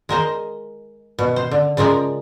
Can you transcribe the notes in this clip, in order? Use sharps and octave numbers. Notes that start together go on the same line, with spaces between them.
G#3 A#4 C5 D#5
B2
C5
D3
C#3 F3 G#3 A#4 D5